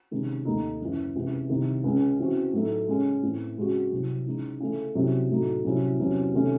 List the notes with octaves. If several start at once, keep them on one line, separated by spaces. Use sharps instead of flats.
C3 D#3 G#3 C#4
D#2 D#3 A3 D#4
F#2 C#3 E3
C#2 C3 E3
C2 C3 D#3
C#2 C#3 G#3 C#4
C#3 E3 C4 F#4
A2 F#3 A3 D#4
C#3 G#3 C#4
A2 E3 C4
C#3 G#3 C4 F#4
C2 C3 F#3 C4
C#3 E3 G#3 D#4
C#3 E3 A3 C#4
C2 C3 F#3 C#4
A2 F#3 A3 D#4 F#4
C2 C3 F#3 C#4 E4
E2 C3 F#3 C#4
C3 D#3 A3 C#4